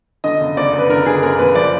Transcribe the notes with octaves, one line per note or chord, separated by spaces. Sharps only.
D3 D#5
F#1
F#1 D5
F#1 B4
D3 A#4
D3 G#4
F#1 A#4
F#1 B4
F3 D5